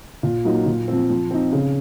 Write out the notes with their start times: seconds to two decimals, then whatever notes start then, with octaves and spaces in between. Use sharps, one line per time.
0.23 A#2
0.45 F#3 A#3 D#4
0.66 A#2
0.88 F3 C4
1.10 F3
1.31 C4 D#4
1.52 C#3